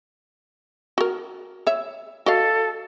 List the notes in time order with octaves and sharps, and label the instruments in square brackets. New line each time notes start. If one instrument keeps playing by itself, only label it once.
[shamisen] F#4 A#4
C#5 E5
[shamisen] F#4 D#5 F5 [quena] A4